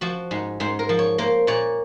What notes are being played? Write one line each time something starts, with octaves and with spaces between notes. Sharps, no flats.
F3 F#4
G#2
G#2 C5
A#4
F3
C#5
A#3 C5
A#2 C#5